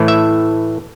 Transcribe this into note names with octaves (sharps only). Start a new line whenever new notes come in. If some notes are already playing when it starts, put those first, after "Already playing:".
Already playing: A2 E3 A3
E5